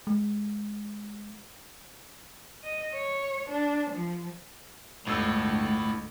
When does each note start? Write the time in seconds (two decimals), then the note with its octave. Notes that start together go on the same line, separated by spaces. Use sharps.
0.07 G#3
2.63 D#5
2.94 C#5
3.49 D4
3.90 F3
5.07 G1 D2 A2 G#3 E6